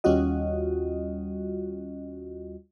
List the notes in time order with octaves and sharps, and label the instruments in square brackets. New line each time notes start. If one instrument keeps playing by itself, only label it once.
[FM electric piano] D#2 G3 C#4 F4 F#4 D#5